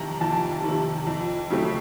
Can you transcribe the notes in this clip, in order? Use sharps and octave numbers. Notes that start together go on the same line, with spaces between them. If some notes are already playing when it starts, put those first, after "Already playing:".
Already playing: F2 C3 D#3 A5 A#5
F2 A5
C3 D#3
F2
C#3 F#3 A3 C4